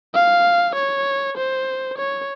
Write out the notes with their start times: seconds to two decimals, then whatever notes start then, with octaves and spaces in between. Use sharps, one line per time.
0.15 F5
0.75 C#5
1.37 C5
1.98 C#5